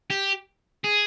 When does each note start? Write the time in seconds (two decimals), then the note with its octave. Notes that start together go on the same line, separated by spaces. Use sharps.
0.10 G4
0.84 G#4